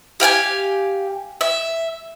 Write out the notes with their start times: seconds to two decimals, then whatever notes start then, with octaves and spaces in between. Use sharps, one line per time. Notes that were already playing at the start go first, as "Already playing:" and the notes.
0.20 G4 F5 G5 G#5
1.41 E5